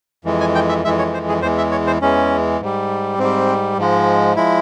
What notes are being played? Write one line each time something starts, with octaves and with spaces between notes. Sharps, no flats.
F2 E3 G#3
G#5
G5
E5
F2 E3 G#3 E5
C#5
C5
G#4
E2 E3 G#3 C5
E5
C#5
C5
E2 E3 G#3 C#4
G#2 G3
G#2 G3 C4
G#2 F3 G#3
F3 G#3 E4